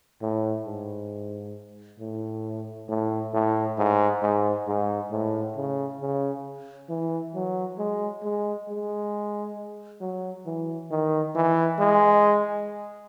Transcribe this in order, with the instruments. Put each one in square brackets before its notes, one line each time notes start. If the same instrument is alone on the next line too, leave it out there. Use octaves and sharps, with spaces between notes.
[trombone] A2
G#2
A2
A2
A2
G#2
G#2
G#2
A2
C#3
C#3
E3
F#3
G#3
G#3
G#3
F#3
E3
D#3
E3
G#3